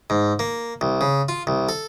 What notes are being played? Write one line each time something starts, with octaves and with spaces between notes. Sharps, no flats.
G#2
A#3
C2
C#3
F4
C2
A4